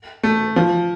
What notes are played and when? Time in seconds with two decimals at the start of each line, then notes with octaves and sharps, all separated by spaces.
0.23 A3
0.56 F3